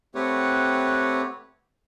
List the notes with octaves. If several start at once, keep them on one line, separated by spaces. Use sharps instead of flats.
A3 C4 G4 B4 C#5 F#5